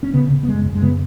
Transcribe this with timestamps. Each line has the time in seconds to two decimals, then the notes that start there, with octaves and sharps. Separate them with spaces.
0.03 C#4
0.14 C#3 B3
0.30 C#3
0.43 B3
0.48 F#2 G#3
0.65 F#2
0.75 G#3
0.82 C#3 B3